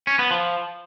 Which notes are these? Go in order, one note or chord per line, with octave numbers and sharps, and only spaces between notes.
C#4
B3
F3